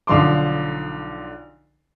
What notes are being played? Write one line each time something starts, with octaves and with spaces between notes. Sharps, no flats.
B1 D3 F3 C6 D6